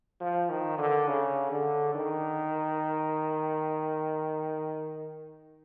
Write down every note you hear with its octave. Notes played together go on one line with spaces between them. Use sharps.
F3
D#3
D3
C#3
D3
D#3